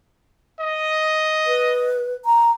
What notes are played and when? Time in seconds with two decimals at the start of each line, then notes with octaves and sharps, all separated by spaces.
0.59 D#5
1.46 B4
2.25 A#5